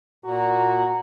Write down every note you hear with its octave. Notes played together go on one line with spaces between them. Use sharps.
A#2 F#4 A#5